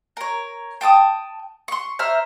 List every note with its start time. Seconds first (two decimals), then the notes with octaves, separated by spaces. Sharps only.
0.17 A#4 C#5
0.81 G5 A5 D6 D#6
1.68 C6 C#6
1.99 C5 E5 A#5 F6